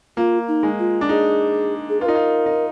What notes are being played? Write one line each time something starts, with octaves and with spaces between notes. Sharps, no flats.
A#3 F4
D#4
G#3
F4
D4
D#4 G#4
G#4
F4 B4
D#4 A#4
F4
D#4